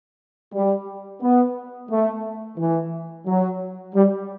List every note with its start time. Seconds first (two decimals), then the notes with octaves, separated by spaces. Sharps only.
0.52 G3
1.21 B3
1.89 A3
2.57 E3
3.26 F#3
3.94 G3